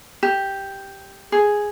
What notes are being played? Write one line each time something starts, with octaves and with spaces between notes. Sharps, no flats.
G4
G#4